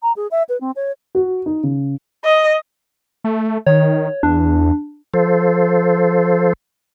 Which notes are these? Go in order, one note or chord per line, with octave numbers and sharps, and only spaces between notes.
A#5
G#4
E5
B4
C4
C#5
F#4
D#4
C#3
D#5
A3
D#3 C#5
E2 D4
F3 A4 C5